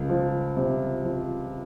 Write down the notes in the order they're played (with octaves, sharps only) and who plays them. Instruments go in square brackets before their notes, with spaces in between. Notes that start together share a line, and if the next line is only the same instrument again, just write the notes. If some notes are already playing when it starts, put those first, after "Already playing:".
Already playing: [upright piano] C#2
F3
C3
F3